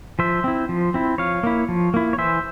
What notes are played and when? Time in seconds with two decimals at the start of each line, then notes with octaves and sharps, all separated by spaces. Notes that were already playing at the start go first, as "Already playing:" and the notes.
0.19 F3 C5 E5
0.44 C4 E4
0.69 F3
0.94 C4 E4
1.18 F3 C#5 F5
1.43 A#3 E4
1.69 F3
1.94 A#3 E4
2.13 C#5
2.18 E3 C5 E5